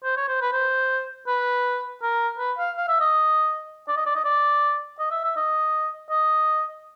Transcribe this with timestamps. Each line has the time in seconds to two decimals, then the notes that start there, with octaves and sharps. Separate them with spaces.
0.04 C5
0.17 C#5
0.28 C5
0.41 B4
0.53 C5
1.27 B4
2.02 A#4
2.38 B4
2.58 F5
2.76 F5
2.88 E5
3.00 D#5
3.88 D5
3.96 D#5
4.06 D5
4.15 D#5
4.24 D5
4.99 D#5
5.11 E5
5.24 E5
5.36 D#5
6.10 D#5